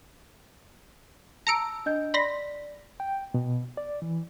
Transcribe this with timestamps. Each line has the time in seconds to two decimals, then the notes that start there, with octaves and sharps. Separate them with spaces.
1.47 A5 A#5 E6 C#7 D7
1.86 D4 D#5 G6
2.14 D5 B5 C6 A#6 B6
3.00 G5
3.34 B2
3.77 D5
4.02 E3